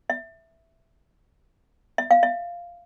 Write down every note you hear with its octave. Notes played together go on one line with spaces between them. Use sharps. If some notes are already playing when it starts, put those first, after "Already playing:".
E5
E5
F5
E5